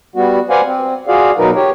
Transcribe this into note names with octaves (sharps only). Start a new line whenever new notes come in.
G3 B3 F#4
B4 C5 D5 F5 F#5 G#5
C4
F4 F#4 G#4 D5 F5
B2 F#3 D#4 A#4 B4
G4 C#5